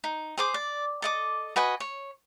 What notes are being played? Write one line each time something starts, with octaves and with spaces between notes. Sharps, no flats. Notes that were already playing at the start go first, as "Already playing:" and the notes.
D#4
G#4 C5 D6
D5
A4 D#5 D6
F#4 B4 D#5 G#5
C#5